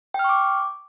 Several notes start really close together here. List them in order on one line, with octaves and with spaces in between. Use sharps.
G5 F6 C#6 D6